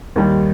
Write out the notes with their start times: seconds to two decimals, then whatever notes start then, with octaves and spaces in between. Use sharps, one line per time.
0.16 D#2 D#3 G3